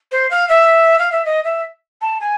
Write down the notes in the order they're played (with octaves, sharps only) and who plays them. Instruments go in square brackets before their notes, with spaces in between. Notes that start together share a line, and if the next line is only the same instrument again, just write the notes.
[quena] C5
F5
E5
F5
E5
D#5
E5
A5
G#5